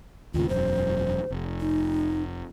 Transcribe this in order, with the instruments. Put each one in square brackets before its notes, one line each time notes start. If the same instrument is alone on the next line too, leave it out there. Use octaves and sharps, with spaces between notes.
[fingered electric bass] D#2 A2 C#3 [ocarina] F4
[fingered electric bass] E1 F#2 [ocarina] C5
[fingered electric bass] F1
[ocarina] D#4